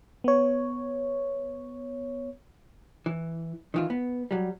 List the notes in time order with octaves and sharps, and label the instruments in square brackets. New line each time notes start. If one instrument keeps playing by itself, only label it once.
[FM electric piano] B3 C#5
[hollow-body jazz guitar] E3
D#3 E3 F4
B3
F#3 G3